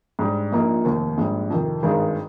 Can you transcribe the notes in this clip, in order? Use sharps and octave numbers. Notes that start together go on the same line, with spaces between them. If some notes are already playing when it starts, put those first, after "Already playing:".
G#2 G3 D4
A#1 A#2 F3 A#3 D#4
F1 D#2 D#3
A#1 G#2 G3
F2 C3 D#3
G#1 G2 D#3 G#3 D#4